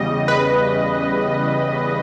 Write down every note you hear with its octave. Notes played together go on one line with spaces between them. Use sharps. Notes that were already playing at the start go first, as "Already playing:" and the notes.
Already playing: E2 C#3 G3 D#5
B4